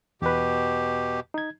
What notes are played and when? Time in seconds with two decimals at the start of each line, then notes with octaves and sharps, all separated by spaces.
0.22 E2 B2 G4 B4
1.34 D#4 G#6